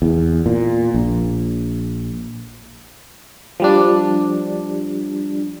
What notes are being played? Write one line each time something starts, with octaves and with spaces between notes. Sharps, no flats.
E2
A#2
A#1
F3 G3 D4